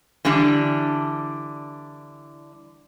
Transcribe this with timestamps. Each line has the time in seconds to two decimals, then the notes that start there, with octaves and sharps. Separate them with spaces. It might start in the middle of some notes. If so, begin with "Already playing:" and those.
0.25 D3 E3 G3 D4